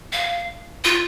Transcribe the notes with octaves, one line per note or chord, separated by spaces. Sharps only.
F5
F4